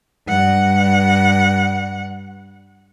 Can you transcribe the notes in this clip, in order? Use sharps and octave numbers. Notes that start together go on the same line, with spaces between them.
G2 F#5